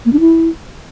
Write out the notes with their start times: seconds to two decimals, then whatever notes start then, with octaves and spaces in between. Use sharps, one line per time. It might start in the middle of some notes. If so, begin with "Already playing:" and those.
0.06 A#3
0.13 D4
0.20 E4